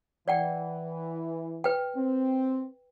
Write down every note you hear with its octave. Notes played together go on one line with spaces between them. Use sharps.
E3 D5 F#5 G5
B4 G5
C4